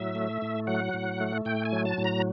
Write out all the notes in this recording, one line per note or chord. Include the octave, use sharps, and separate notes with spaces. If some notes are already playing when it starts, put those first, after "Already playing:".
Already playing: A2 F#3 E5
A3
A2
F#3 F#5
A2
A3
A2 G5
G#5
F#3
A5
A2
A#5